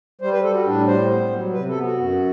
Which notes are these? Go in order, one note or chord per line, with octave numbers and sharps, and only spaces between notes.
G3 C5
B4
G3 A4
F#4
A2 D4
G3 C5
B3
F#3
C3 B4
A4
B3
F#4
F#2